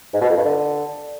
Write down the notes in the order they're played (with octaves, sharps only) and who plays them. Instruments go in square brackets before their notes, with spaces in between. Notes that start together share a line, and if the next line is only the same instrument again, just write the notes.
[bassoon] G#2
B2
F2
G2
D3